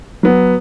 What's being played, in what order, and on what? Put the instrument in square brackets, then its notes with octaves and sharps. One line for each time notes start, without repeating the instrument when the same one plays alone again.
[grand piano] F#3 B3